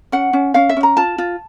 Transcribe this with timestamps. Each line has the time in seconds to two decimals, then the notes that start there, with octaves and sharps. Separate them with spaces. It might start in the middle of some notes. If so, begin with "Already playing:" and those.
0.12 C#4 F#5
0.33 C#4
0.54 C#4 F5
0.69 E5
0.77 C#4
0.83 A#5
0.97 F4 A5
1.18 F4